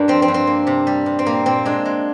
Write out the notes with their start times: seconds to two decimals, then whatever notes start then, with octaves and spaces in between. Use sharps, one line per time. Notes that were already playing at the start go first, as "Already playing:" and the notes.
Already playing: G2 A#3 D4
0.08 F3 C4
0.22 C4
0.28 G2
0.34 C4
0.47 A#3
0.67 C3
0.87 G3
1.06 C3
1.19 C4
1.26 A#2 A#3
1.46 A#2 C4
1.65 G#3 D4
1.85 G#3